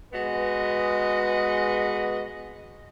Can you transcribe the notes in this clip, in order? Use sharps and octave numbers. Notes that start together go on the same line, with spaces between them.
G#3 B3 F#4 B4 D#5